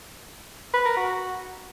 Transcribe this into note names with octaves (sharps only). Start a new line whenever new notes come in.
B4
A#4
F#4